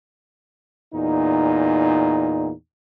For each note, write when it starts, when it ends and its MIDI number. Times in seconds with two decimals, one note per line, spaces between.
0.94 2.52 40
0.94 2.52 46
0.94 2.52 63